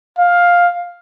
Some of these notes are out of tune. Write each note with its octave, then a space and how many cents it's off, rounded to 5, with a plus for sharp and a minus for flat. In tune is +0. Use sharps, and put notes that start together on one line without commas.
F5 +10